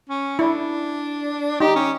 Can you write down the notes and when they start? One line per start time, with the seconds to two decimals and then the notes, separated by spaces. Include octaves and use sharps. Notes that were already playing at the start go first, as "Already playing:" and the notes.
0.09 C#4
0.39 D4 E4
1.60 D#4 G4
1.76 C#4